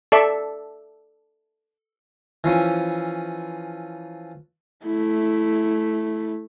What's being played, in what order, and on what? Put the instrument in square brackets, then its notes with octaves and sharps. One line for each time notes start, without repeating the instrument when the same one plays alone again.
[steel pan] A4 D5 E5
[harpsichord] E3 F3 C#4
[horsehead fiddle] A3 E4